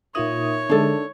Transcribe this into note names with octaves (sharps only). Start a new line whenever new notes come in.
A#2 D#4 F4 A#4 C#5 E5 D#6
D3 G#3 D4 A4